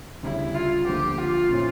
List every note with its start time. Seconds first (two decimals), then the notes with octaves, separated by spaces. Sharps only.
0.23 D2 C#3 G3 C#4 E4 G4
0.55 F4
0.86 D2 D3 F3 A#3 G4
1.18 F4
1.49 A#2 F3 C#4 E4